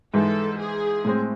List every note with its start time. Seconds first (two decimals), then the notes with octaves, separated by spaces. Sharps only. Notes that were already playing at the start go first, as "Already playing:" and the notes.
0.13 G#2 E3 G#3 D#4 A4
0.59 G#4
1.05 A2 G#3 C4